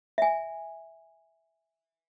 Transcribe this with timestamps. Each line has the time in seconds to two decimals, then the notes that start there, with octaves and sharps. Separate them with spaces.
0.18 E5 G#5